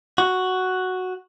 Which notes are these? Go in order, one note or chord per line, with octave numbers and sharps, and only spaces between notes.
F#4